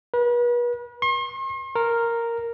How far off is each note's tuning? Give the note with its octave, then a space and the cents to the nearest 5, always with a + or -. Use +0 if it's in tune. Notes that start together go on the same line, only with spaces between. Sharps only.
B4 -40
C6 +45
A#4 -5